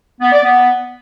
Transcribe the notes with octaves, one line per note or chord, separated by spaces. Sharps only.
B3
D5
B3